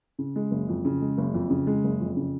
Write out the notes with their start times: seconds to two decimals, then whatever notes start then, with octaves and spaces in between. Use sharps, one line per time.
0.19 C#3
0.36 G#3
0.51 F#1
0.69 F2
0.85 C#3
1.02 G#3
1.18 F#1
1.34 F2
1.50 C#3
1.67 G#3
1.84 F#1
2.00 F2
2.17 C#3